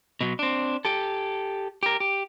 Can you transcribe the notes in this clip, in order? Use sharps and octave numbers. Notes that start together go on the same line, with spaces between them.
B2 F#3
C4 D4
G4 A4
G4 A#4
G4